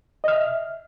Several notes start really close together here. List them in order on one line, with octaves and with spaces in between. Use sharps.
D#5 F6 E5